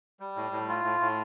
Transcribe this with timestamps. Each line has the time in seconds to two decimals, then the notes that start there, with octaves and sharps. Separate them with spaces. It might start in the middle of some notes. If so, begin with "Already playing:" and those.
0.20 G3
0.36 A2
0.52 A2
0.69 F4
0.84 A2
1.00 A2